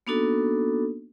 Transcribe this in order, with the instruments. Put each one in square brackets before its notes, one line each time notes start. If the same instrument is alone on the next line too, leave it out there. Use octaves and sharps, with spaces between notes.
[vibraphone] A#3 B3 D4 D#4 F#4 A4